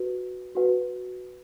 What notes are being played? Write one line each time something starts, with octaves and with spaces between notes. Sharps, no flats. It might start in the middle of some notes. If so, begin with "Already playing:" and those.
Already playing: F#4 B4
F#4 B4 F#5